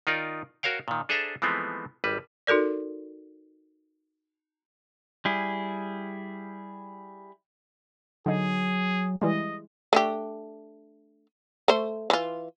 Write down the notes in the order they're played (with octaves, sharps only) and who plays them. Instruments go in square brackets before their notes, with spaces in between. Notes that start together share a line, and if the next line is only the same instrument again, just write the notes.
[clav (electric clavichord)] D#3 D#4 F4 A#4 D5
F#4 A#4 C#5 F5 G5
A#2 D#3
D4 G#4 A4 C5 E5 A#5
E3 F3 G#3 A3 B3 C4
G#1 G3 B4
[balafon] D#4 F#4 A4 A#4 D5
[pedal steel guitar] G3 E4 G#4
[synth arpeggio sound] D3 D#4 [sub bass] F#3 [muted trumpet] G#4
[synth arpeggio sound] E3 G3 G#3 [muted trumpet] D#5
[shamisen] A3 D4 G4
A3 C5
E3 F4